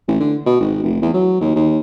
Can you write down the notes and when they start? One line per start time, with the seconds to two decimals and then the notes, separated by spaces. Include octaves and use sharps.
0.08 A1
0.20 D3
0.46 B2
0.60 G#1
0.83 F1
1.02 E2
1.13 F#3
1.41 D#2
1.56 D#2